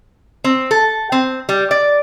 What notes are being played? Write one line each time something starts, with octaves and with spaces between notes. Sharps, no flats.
C4
A4
C4
G3
D5